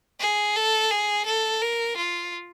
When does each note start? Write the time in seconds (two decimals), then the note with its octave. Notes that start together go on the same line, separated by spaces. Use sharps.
0.20 G#4
0.55 A4
0.90 G#4
1.25 A4
1.61 A#4
1.96 F4